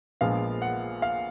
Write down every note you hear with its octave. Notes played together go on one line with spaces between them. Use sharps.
A#1 A#2 F3 G#3 B3 F5
F#5
F5